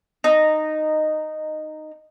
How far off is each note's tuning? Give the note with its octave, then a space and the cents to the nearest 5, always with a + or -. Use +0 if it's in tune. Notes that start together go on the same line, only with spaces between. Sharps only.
D#4 -10